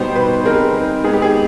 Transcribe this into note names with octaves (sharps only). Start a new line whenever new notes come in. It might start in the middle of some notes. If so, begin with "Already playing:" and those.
Already playing: B2 G3 B3 D#4 G4 C5
B4
G3 C4 D#4 G#4 A#4
G#3 B3 D#4 G#4
G4
G#4